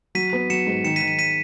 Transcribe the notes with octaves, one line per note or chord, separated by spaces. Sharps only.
F#3 B6 D#7
B3
F#3 C#7 E7
G#2
D#3 C#7 E7
B6 D#7
D#3
B6 D#7
B6 D#7